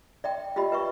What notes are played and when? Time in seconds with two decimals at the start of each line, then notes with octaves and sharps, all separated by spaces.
0.24 D5 E5 G5
0.56 F4 G4 D#5 B5
0.72 B4 E5 C#6